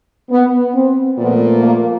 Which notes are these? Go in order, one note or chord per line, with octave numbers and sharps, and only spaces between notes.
B3
C4
A#2 F3 A3 B3
A#3